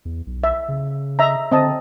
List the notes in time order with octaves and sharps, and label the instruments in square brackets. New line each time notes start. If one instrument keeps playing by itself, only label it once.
[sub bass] E2
B1
[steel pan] E5
[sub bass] C#3
[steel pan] D#5 E5 A#5
[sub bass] D3 [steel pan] C4 D#5 A5